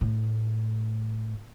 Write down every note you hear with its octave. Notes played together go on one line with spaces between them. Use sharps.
A2